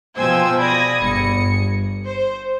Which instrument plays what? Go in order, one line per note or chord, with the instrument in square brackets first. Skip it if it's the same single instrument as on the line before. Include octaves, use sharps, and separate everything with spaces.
[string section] B2 F3 C5 G5 G#5 E6
D5 B5 D#6 G#6 A#6
G1 C#7
C5